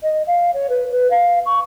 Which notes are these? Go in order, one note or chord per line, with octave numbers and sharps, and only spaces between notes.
D#5
F5
C#5
B4
B4
F5
C#6